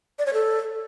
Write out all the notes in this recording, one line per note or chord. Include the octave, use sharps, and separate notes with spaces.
D5
C#5
A4